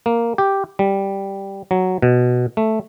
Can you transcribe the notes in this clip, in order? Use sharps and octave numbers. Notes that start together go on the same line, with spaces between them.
A#3
G4
G3
F#3
B2
A3